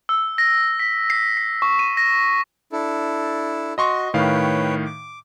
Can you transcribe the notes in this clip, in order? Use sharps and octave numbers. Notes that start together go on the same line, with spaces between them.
E6
A#6
B6
C7
C7
C#6
D#7
A#6
D4 E4 A4
F#4 D#5 C6 C#6
A2 D#3 B4 C#5 F5 G5
D6